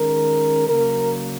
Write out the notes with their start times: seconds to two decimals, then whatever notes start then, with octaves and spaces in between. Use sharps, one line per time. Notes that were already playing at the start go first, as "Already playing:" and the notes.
Already playing: D#3 G#3 C#4 A#4
0.67 C#3 F#3 A#3 A#4